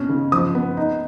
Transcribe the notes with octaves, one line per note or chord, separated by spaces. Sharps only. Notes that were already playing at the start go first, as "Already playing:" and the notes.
Already playing: B2 C#4
C#3
F3 D#6
B3
D#4